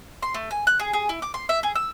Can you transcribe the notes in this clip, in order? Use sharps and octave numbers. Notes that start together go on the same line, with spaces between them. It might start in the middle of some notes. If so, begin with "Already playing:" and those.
C6
A3
G#5
F#6
G#4
G#4
E4
D6
C6
E5
G#4
E6